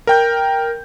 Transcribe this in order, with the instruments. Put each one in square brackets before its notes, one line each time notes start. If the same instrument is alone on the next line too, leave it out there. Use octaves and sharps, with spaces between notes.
[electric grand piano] A#4 G5 G6